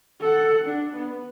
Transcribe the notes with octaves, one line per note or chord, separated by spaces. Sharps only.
A4 F#5
D4
B3